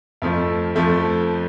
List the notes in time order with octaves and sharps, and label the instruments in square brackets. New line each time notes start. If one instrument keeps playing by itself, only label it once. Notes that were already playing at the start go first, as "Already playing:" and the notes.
[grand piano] F2 F3 A3
F2 F3 A3